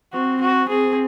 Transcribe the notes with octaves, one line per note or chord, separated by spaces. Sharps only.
C4 F#4
F#4
C4 G#4